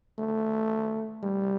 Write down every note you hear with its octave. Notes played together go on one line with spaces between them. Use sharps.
A3
G3